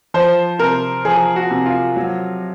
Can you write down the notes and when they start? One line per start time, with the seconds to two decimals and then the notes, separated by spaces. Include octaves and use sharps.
0.14 F3 C5
0.59 C3 A#4
1.05 F3 G#4
1.36 F#4
1.51 C3
1.66 F4
1.96 F#3